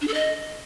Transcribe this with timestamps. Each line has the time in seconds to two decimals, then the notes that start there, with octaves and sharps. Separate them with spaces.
0.01 D4
0.08 A4
0.14 D#5